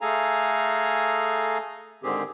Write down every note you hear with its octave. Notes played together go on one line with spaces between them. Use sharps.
A3 G#4 A4 F5 G#5 A#5
G#2 D3 D#3 C4 G4 G#4